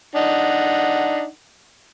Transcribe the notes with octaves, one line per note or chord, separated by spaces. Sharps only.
D4 D#4 F#5